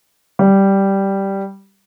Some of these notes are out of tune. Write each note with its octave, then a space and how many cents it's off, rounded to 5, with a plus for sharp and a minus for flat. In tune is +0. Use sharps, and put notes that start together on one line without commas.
G3 -5